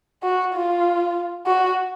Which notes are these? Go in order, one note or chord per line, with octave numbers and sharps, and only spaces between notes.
F#4
F4
F#4